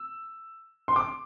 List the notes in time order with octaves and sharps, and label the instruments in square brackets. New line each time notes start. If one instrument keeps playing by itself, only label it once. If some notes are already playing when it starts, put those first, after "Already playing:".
Already playing: [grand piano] E6
C6
D6